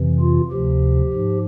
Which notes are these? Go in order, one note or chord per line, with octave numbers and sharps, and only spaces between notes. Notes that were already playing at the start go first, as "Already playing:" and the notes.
Already playing: F2 C3 E3
F4
D2 C3 F3 G4
G#2 F3